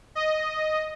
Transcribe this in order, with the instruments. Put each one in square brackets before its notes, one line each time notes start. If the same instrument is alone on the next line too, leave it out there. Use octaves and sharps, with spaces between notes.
[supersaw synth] D#5